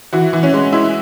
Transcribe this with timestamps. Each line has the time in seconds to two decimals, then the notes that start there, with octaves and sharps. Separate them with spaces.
0.13 E3 F#4
0.33 E3
0.43 C#4
0.54 G#3
0.72 G#3 E4